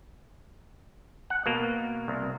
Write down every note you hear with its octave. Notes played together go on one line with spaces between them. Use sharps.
F#5
B2 A#3
C2